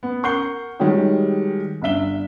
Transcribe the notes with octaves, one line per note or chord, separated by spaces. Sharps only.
B3
A#4 F#5 C#6 G6 C7 G7
D#3 G3 G#3 F#4 G4 C#5
G1 D4 E5 G7